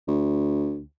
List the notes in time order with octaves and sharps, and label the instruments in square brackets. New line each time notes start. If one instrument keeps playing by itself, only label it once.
[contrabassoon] D2